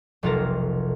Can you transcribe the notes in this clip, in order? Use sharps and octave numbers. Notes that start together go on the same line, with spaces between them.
F1 B1 C3 F4 A4 A#4